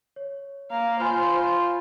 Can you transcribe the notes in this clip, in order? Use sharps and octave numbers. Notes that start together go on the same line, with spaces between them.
C#5
A#3 F5
F4 C5 G#5 B5 F6